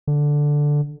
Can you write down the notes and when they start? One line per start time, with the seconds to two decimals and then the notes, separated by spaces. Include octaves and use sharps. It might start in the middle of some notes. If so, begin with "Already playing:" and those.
0.07 D3